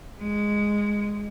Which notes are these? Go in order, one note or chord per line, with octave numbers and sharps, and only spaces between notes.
G#3